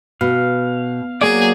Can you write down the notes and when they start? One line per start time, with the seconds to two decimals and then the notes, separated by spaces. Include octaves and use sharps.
0.21 B2 F5
1.21 F#3 A#3 G#4 D5